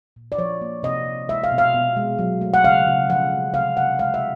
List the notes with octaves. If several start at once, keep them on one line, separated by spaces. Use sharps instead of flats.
A#2
D5
F3 C#5
A#3
C3 D#5
C3
G#3 E5
F5
B2
F5
B2
G#3
F#3
A3
F#5
C#3 F5
C#3
F3 F#5
G#3
C3 F5
C3 F#5
G#3 F5
E5